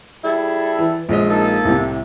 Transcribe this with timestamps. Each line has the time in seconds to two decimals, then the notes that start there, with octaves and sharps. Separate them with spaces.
0.24 G3 E4 G#4 A4
0.79 E3
1.09 A#1 G#3 D#5
1.28 A#3 D#4 A4
1.65 C2 A2 C3